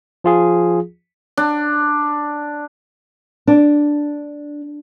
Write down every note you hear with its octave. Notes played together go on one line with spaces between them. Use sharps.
F3 F4 G#4
D4
D4